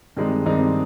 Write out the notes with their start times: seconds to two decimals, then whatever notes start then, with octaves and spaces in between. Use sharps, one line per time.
0.17 G2 D#3 G#3 C4 D#4
0.46 G2 D#3 G#3 C4 D#4